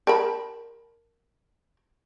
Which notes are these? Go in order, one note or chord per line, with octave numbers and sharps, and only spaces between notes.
A#4 A5 B5